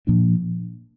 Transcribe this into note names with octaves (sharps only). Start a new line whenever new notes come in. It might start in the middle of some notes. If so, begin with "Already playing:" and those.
A#2 F3 A#3 D4